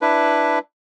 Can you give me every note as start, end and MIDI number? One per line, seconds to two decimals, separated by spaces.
0.02 0.59 62
0.02 0.59 64
0.02 0.59 71